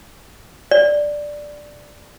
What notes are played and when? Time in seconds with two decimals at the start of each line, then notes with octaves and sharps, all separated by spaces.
0.71 D5